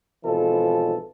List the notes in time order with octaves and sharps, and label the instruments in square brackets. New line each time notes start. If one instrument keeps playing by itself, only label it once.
[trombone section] G#1 B2 E3 F3 A4